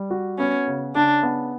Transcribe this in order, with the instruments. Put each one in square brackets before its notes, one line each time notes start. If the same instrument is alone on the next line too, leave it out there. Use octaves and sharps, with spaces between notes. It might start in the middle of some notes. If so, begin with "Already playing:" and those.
Already playing: [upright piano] G3
F#4
[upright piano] B3 [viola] C#4
[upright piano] C#3
[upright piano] C#3 [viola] D4
[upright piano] B3